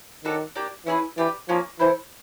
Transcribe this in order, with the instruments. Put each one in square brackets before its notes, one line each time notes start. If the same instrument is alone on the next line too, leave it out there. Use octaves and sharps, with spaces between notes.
[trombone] D#3 [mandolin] D4 F#4 A4 C#5
[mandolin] A#3 D4 G4
[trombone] E3 [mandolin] C#4 E4 G#4 B4
[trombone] E3 [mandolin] D4 G4 B4
[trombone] F3 [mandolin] A#3 C#4 F4
[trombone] E3 [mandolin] E4 A4 C5